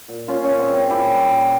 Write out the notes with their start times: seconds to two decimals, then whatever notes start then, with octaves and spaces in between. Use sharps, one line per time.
0.08 A#2
0.28 A#2 C#4 F4
0.43 C#4
0.49 A#2
0.59 C4
0.69 G#3
0.74 C#4
0.89 A#2 E4 G4
1.10 G3
1.31 A#2